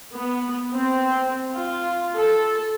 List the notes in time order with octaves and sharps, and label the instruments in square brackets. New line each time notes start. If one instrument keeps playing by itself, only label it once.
[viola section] B3
C4
F4
A4